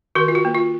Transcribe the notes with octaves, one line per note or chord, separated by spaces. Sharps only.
D#3 F#4 A#4
F4
F#4
A#3
F4